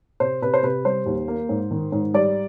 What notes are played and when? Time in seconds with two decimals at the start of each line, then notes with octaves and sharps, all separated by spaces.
0.20 C3 C5
0.42 C3 B4
0.54 C5
0.63 C3 B4
0.85 G3 C5
1.06 D#2
1.28 A#3
1.49 G#2
1.71 D#3
1.92 G#2
2.14 G3 D5